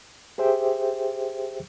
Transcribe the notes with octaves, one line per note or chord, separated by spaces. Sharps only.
G4 G#4 C5 E5 G5